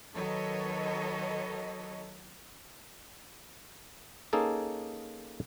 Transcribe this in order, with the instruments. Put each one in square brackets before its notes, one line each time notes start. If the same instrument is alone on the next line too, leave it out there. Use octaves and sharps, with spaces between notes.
[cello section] D#3 F#3 A4 B4 C#5 D#5
[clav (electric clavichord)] A#3 C#4 D#4 G#4 A4